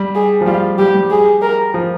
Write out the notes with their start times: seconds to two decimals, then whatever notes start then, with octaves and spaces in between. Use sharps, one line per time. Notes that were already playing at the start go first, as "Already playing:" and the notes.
Already playing: G3
0.15 G#4
0.41 F3
0.46 G3 F4
0.78 G3 G4
0.94 G3
1.10 G#4
1.42 A#4
1.74 F3